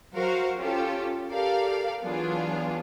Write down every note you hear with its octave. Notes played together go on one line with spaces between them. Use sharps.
F#3 F#4 A#4 C5 F5 F#5
C#4 F4 G4 A4
G4 A4 A#4 D5 F5
E3 F#3 B3 D4 F4 G#4